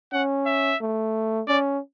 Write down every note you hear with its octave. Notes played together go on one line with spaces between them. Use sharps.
C#4 F#5
E5
A3
C#4 D5